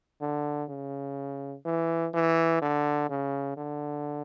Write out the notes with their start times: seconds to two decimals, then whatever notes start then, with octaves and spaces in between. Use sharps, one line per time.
0.21 D3
0.69 C#3
1.65 E3
2.14 E3
2.62 D3
3.09 C#3
3.57 D3